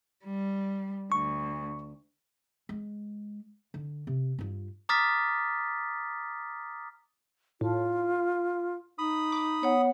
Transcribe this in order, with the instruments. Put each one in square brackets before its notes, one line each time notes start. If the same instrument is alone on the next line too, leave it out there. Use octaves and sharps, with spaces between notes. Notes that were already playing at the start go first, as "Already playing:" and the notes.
[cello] G3
[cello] D2 [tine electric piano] C#6
[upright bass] G#3
D3
C3
G2 F4
[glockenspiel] A#5 D6 D#6 F6 A6 B6
[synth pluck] A2 [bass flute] F4
[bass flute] D#4 [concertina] B5 D#6
[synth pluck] D6
[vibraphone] B3 C#5 F#5